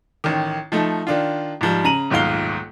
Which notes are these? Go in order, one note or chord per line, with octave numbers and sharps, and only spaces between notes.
A1 D#3
F3 A3 D#4
D#3 D4 F4
G#2 F3 G3
C#3 A#5 D#7 F#7
D#1 B1 G#2 F4 F5 G7